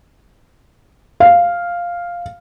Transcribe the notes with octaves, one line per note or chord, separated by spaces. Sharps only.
F5